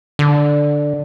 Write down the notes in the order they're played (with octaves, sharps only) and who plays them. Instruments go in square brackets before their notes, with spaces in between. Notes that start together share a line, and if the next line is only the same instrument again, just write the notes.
[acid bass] D3